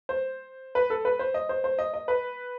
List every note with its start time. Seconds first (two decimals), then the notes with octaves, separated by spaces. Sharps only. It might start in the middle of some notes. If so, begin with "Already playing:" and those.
0.09 C5
0.75 B4
0.90 A4
1.05 B4
1.19 C5
1.34 D#5
1.49 C5
1.64 C5
1.79 D#5
1.94 D#5
2.08 B4